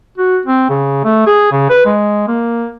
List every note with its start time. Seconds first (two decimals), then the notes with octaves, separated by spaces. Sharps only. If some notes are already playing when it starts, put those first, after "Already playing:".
0.18 F#4
0.46 C4
0.70 C#3
1.04 A3
1.27 G#4
1.52 C#3
1.70 B4
1.86 G#3
2.28 A#3